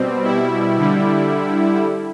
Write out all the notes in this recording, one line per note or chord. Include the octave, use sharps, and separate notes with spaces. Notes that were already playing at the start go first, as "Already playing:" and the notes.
Already playing: B2 G3 C4
E4
D3 G3